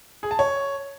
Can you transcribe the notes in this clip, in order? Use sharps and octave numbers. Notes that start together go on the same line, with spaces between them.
G#4
A5
C#5